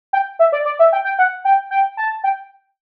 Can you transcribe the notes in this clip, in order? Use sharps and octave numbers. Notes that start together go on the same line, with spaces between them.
G5
E5
D5
D5
E5
G5
G5
F#5
G5
G5
A5
G5